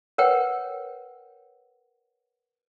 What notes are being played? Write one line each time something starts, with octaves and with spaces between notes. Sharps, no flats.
A#4 B4 C#5 F#5 G5